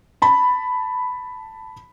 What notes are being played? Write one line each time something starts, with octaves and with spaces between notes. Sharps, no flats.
A5 B5